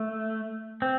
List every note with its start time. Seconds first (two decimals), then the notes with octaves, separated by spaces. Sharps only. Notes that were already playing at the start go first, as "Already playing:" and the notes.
Already playing: A3
0.82 C4